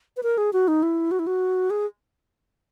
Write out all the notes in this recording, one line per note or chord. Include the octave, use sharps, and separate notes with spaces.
B4
A#4
G#4
F#4
D#4
E4
F#4
E4
F#4
G#4